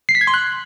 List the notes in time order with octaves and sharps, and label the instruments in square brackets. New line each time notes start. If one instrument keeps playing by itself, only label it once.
[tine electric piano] C7
B6
G#6
C6
F#6